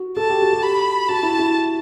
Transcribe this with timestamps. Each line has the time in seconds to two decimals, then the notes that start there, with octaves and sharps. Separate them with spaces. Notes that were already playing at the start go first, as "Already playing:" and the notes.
Already playing: F#4
0.17 A4 A5
0.30 G4
0.42 F#4
0.53 G4
0.63 B5
1.08 F#4 A5
1.23 E4
1.39 E4